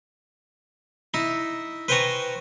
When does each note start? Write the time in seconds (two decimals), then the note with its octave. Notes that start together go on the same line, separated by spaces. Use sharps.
1.14 D#4 E4
1.88 B4 C5 G5 G#5 A#5 C#6